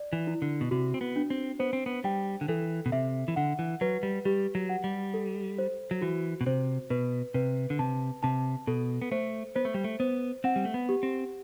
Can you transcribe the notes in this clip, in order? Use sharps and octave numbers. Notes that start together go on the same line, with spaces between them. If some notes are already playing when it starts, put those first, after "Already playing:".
Already playing: D5
E3
E4
D3
B2
C3 F#4
C4
B3
D4
C4
B3 C5
C4
B3
G3 G5
D3
E3 A4
B2
C3 E5
E3
D3 F#5
E3
F#3 B4
G3
G3 G4
F#3
F#5
G3
A4
C5
F#3
E3 F#4
B2
C3 C5
B2 B4
C3 B4
D3
C3 A5
C3 A5
B2 A4
B3
A3 C5
B3 C5
A3
G3
A3
B3 C5
C4 F#5
G3
A3
B3
G4
C4